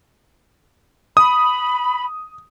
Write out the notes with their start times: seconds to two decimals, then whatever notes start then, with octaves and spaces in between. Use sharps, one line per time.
1.17 B5 D#6